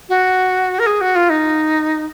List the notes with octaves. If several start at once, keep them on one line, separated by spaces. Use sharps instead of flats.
F#4
A#4
G#4
F#4
F4
D#4